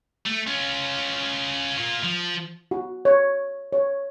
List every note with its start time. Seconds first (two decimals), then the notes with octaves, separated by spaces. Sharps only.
0.26 A3
0.47 C#4 F4
1.78 A#3 F4
2.04 F3
2.71 F#4
3.05 C#5
3.73 C#5